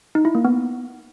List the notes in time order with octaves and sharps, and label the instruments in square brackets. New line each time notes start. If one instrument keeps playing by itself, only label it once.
[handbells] D#4
E4
A#3
B3